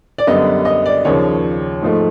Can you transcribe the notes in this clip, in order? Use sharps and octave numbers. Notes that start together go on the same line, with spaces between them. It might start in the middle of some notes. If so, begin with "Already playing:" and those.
D5
F#2 D3 G3 B3 D#5
D#5
D5
D#2 C#3 F3 C#5
G#2 F3 A3